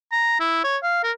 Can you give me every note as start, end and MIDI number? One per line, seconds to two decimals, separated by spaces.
0.12 0.39 82
0.40 0.60 64
0.64 0.77 73
0.83 1.03 77
1.03 1.12 70